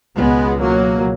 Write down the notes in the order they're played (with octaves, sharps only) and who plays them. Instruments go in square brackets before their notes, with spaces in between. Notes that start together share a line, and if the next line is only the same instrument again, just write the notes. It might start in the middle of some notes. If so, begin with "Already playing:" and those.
[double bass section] C#2 B2 G#3 B3
F#3 A#3